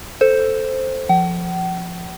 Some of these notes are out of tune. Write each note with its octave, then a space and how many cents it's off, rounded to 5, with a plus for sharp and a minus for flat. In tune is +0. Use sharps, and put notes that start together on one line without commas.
A4 +0 C5 +0
F3 +0 F#5 +45